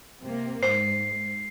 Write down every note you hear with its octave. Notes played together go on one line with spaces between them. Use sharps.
C3 A#3
G#2 C5 C7